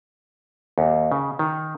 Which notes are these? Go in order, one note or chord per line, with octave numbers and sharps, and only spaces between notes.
D#2
C#3
D#3